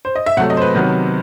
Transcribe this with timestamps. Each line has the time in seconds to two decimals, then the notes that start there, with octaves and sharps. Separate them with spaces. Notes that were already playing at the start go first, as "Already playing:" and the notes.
0.05 C5
0.15 D#5
0.26 E5
0.37 C3 F#3 A3 F#5
0.50 D#5
0.57 C5
0.61 B4
0.75 C3 D#3 F#3 B3